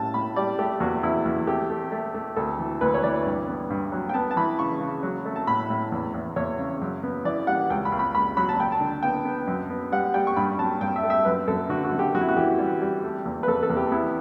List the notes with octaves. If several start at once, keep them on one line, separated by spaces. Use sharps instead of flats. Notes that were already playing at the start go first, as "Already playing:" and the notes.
Already playing: A2 C#3 G3 A5
A2 B5
G3 D5
A3 G4
E2 F#4
E2 E4
E2
A3 G4
A3
A3
A3
D2 A4
E3
D2 B4
C#5
E3 D5
G2
B3
G2
F#3
G5
B3 A5
A5
E3 B5
C#3 C#6
C#3
F#3
A3
A5
A2 B5
A2
E2
E2
E2 C#5
C#3
F#2
B3
E3 D5
G3 F#5
C#2 G5
B5
C#2
B5
C#2 B5
F#3 B5
A5
F#3 G5
A5
D3
B3 G5
B3
F#2
B3
G3 F#5
G3 G5
C#6
G2 B5
F#3 A5
G2 G5
E5
A3
E5
F#2 B4
F#2 A4
D3 F#4
F#4
F#2
G4
F#2 F#4
E4
F#4
E3 G4
G3
G3
A3
E2
B4
E2 A4
A4
E2
G4
B3 E4